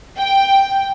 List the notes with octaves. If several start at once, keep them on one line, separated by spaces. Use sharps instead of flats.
G5